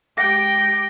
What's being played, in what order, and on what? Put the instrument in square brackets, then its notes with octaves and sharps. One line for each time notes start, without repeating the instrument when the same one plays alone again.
[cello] G#3 G4 [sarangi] G5 [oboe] D6 [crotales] A#6